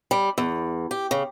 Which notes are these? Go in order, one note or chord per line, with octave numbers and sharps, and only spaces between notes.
G3
E2
G4
C#3